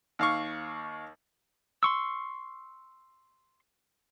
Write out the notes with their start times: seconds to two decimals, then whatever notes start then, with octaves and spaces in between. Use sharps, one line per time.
0.19 D#2 F5 C#6
1.83 C6 C#6 E6